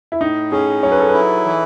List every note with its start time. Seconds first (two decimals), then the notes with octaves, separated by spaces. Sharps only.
0.12 E4
0.20 A2 D#4
0.52 C#4 G#4
0.83 F#3 C#5
0.91 B4
1.00 A4
1.08 E4 B4
1.45 E3